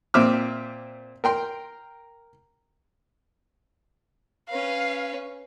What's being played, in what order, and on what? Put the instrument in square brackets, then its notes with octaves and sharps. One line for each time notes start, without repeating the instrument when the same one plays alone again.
[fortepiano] A#2 C4 E5 D6 F6
A#4 G5 C6
[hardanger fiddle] C#4 B4 [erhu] F5